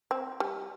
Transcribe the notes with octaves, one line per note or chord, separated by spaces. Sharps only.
C4
G3